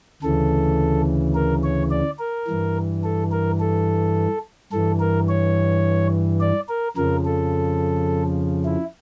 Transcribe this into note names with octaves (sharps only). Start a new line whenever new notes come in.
D2 C#3 E3 A4
A#4
C#5
D5
A#4
G2 E3
A4
A#4
A4
G2 E3 A4
A#4
C#5
D5
A#4
F2 C#3 F3 A#4
A4
E4